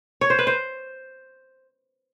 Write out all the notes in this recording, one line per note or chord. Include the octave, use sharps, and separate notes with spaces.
C#5
C5
B4
C5